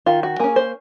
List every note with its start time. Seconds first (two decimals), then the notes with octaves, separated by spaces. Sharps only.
0.06 D#3 F4
0.23 F#4
0.39 A#3 C#4 G#4
0.56 C5